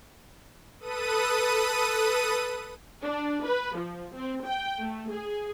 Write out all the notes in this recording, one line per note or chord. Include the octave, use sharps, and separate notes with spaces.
A4 B4 D#6 D#7
D4
B4
F3
C4
G5
A3
G#4